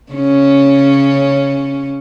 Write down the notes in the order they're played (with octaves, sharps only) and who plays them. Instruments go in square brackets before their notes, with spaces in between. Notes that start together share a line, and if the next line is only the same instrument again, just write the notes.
[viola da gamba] C#3 C#4